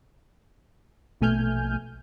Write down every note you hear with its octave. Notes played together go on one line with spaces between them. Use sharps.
A#1 B2 A3 G#5 F6 G6